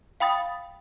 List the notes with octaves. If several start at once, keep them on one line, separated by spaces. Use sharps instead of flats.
F5 G5 B5 D#6 A6